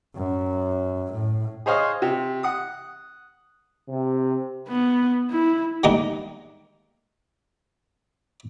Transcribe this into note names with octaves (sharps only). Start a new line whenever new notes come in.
F#2
A2
G#4 C5 C#5 D#5 F5
C3
F#5 D#6
C3
B3
E4
D3 G3 G#3 A#3 D4 D#4